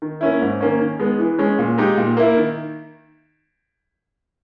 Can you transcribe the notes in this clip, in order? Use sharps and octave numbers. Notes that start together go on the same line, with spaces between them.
D#3
A#3 C#4 E4
G#2
D#3 A#3 C#4
D#3
G#3 B3
E3
G#3 C#4
A#2
G#3 D#4 G4
A#2
A#3 E4
D#3